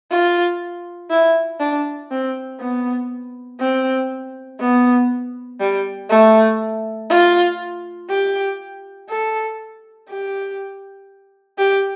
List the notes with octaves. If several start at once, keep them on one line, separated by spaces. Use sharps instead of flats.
F4
E4
D4
C4
B3
C4
B3
G3
A3
F4
G4
A4
G4
G4